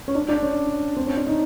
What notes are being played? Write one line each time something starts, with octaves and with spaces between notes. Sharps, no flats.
C#4
D4
D4
C#4
C4
C#4
D4
D#4